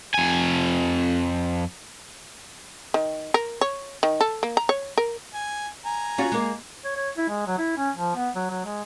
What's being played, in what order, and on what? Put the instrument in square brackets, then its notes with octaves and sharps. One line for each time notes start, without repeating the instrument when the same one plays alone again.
[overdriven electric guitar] F2 G#5
[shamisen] D#3
A#4
C#5
D#3
A4
A#3
A#5
C#5
A#4
[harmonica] G#5
G#5 A#5
[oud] C#4 F4 F#4
G#3 A#3
[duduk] C#5
C#5
E4
G#3
F#3
E4
C#4
F3
B3
F#3
F#3
G#3